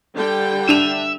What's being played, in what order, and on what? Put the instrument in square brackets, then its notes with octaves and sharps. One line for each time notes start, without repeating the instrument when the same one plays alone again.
[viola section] D3 G3 G5
[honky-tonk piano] D4 D#7 F7 [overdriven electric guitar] E5